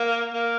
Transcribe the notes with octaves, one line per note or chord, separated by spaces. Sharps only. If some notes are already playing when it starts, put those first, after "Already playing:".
Already playing: A#3
A#3